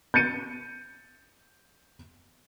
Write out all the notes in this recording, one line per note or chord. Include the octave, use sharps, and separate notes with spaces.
G6 A6 C#7 D#7